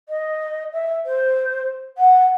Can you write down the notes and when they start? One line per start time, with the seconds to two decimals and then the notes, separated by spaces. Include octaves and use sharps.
0.09 D#5
0.73 E5
1.06 C5
1.98 F#5